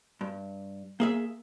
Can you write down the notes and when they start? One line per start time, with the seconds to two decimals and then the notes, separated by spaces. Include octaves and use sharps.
0.21 G2
1.00 A#3 G#4 E5